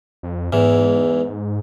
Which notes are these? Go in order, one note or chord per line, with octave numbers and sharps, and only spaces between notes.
F2
E2 G#2 E3